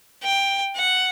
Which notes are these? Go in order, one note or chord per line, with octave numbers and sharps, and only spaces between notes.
G5
F#5